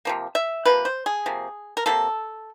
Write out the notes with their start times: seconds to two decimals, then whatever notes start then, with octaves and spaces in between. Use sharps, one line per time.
0.05 C3 F3 A#3
0.35 E5
0.65 C3 F3 A#3 B4
0.85 C5
1.06 G#4
1.26 C3 F3 A#3
1.77 A#4
1.86 C3 F3 A#3 A4